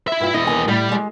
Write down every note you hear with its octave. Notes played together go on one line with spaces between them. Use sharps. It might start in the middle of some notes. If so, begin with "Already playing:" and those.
E4 E5
G2 F4
E2 E4 D#5
D#2 G#5
A2 G3
G#3